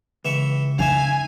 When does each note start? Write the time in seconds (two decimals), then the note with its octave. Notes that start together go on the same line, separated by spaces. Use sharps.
0.25 C#2 E3 E5 C#6
0.79 C#4 D#4 E5 F5 G#5